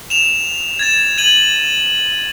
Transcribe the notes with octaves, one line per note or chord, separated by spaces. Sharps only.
E7 F7
G#6 A6 E7
G#6 D#7 F#7